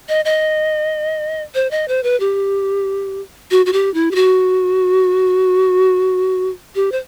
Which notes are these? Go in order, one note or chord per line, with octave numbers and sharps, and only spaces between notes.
D#5
D#5
C5
D#5
C5
B4
G4
F#4
F#4
G4
E4
G4
F#4
G4
C5